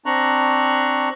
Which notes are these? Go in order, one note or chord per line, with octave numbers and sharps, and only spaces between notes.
C4 D4 A#5 C#6 F#6